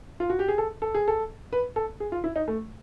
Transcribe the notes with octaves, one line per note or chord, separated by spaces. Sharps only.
F4
F#4
G4
G#4
A4
A4
G#4
A4
B4
A4
G#4
F4
E4
D#4
A3